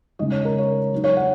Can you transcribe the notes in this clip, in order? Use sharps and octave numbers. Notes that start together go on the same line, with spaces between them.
C#3 G#3 D#4 D#5
C#5
A#4
C#5
F#3 D#4
C#5
F#5